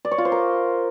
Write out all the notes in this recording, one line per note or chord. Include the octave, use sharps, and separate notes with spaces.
D5
C#5
F4
C5
A#4